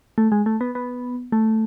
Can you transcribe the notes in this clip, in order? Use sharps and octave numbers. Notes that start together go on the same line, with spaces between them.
A3
G#3
A3
B3
B3
A3